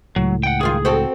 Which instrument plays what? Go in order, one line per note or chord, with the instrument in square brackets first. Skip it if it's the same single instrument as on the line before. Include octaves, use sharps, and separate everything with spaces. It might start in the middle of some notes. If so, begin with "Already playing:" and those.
[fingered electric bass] C#2 A2 [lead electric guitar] F#3
[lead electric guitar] F#5 G5
[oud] G2 D#3 F4 [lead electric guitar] G#4
[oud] C4 F#4 A4